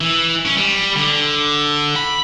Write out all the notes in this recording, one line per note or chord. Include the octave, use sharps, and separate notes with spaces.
E3
C#4
G3
D3
B5